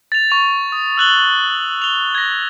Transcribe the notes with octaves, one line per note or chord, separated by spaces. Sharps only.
A6 F7
C#6 F7
D#6
E6 F#6 F#7 G7
F7 G7
G#6 A#6